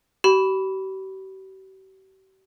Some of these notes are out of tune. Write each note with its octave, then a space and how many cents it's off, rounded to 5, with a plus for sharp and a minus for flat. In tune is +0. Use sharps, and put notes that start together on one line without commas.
G4 -45 B5 +0